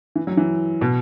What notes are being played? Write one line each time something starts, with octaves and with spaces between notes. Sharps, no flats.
E3
F#3
E3
B2